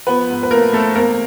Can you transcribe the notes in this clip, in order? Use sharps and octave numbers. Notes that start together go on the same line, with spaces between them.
F3 B3 B4
G#2
B4
A3 A#3 A#4
A3 C4 A4
E2 A#3 A#4